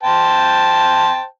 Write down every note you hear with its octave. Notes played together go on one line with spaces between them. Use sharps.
C5 G5 A5